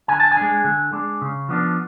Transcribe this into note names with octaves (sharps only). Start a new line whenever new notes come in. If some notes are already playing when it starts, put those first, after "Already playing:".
D3 G#5
A5
G#5
G#3 D4
D3
G#3 D4
C#3
F3 B3 D4